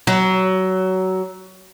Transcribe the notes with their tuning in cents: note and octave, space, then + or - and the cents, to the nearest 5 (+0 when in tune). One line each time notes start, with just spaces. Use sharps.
F#3 +20